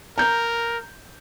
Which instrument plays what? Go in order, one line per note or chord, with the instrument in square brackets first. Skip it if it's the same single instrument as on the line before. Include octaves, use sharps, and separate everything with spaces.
[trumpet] A#4 [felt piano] A#5 G6